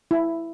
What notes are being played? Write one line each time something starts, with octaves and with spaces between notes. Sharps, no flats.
E4